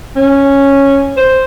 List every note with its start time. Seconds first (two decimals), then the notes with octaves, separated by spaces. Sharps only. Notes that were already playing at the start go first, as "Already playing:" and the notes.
0.16 C#4
1.17 C5